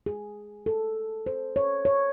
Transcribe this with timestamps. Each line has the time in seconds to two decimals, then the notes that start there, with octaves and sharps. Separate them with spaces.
0.06 G#4
0.66 A4
1.26 C5
1.56 C#5
1.85 C#5